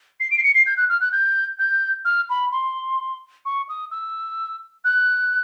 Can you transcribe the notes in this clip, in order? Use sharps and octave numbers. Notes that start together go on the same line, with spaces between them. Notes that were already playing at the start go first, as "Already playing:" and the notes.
C7
D7
C7
C#7
C7
G6
F#6
F6
F#6
G6
G6
F6
B5
C6
C#6
D#6
E6
F#6